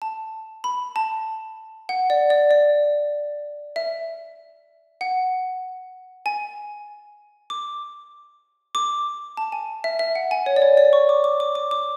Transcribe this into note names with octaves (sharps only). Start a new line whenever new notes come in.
A5
B5
A5
F#5
D5
D5
D5
E5
F#5
G#5
D6
D6
A5
G#5
E5
E5
F#5
G#5
C#5
D5
C#5
D5
C#6
D6
D6
D6
D6
D6